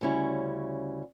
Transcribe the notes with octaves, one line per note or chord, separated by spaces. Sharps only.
D2 C#3 G3 C#4 E4